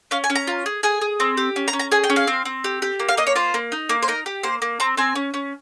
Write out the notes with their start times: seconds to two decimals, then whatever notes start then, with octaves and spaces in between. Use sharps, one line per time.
0.11 C#4 F5
0.24 G#5
0.30 C#4
0.35 A#5
0.47 F4
0.66 G#4
0.83 G#4 G#5
1.01 G#4
1.20 C4
1.37 G4
1.56 C#4
1.68 A#5
1.73 C#4
1.79 A#5
1.92 G#4 G#5
2.04 G5
2.10 C#4
2.16 F5
2.27 C4
2.45 C4
2.64 G4
2.82 G4
3.00 A#3
3.09 F5
3.17 A#3 D#5
3.27 C#5
3.35 F4 C5
3.54 A#3
3.72 D#4
3.89 A#3
4.02 C5
4.08 D#4 A#4
4.26 G4
4.43 A#3 C5
4.62 A#3
4.80 C4 A#5
4.97 C4 G#5
5.15 C#4
5.34 C#4